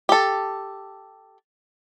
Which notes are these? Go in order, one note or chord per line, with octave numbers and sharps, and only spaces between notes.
G4 A4